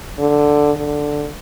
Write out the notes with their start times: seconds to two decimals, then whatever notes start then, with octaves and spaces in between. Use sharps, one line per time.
0.19 D3
0.76 D3